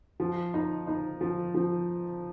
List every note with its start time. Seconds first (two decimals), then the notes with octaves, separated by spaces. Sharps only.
0.20 F3
0.54 D#4
0.87 D#4
1.21 F3
1.55 F3